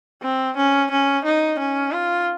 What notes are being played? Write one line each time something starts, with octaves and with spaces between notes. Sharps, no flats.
C4
C#4
C#4
D#4
C#4
F4